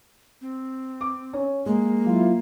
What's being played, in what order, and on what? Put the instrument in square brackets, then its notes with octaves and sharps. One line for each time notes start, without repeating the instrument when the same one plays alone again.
[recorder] C4
[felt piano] D6
C#4 C#5
[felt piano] G#3 [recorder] A#3
[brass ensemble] F#3 E4 F4